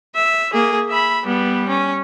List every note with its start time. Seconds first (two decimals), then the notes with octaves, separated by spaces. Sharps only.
0.16 E5
0.53 A#3 G#4
0.89 E5 B5
1.27 G3 B3
1.68 C#4